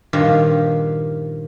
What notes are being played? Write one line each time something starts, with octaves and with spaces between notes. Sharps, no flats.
G2 A#2 D#3 F3 G4 F5